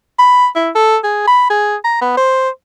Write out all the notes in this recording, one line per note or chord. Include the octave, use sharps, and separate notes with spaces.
B5
E4
A4
G#4
B5
G#4
A#5
B3
C5